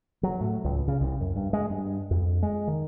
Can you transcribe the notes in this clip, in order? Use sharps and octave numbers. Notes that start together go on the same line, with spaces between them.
F#3
A2
C#2
C#3
C2
F#2
G2
G#3
G2
F2
G#3
D#3